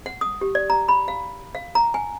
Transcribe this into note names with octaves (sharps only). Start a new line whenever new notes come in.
F#5
D#6
G4
D5
A#5
B5
F5
F5
A#5
G#5